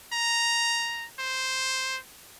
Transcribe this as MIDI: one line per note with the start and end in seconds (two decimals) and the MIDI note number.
0.12 1.06 82
1.19 1.98 72